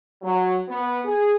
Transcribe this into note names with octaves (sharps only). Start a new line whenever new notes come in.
F#3
B3
G#4